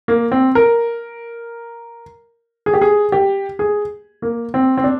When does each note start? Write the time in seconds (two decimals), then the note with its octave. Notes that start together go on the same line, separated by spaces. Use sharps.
0.08 A#3
0.32 C4
0.55 A#4
2.66 G#4
2.74 G4
2.82 G#4
3.12 G4
3.59 G#4
4.22 A#3
4.54 C4
4.78 C4
4.84 D4